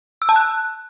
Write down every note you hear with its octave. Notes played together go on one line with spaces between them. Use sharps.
E6
A5
F#6